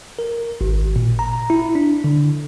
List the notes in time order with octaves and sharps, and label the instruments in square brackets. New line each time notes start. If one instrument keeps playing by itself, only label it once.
[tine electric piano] A#4
G#1
A#2
A#5
E4
D4
D3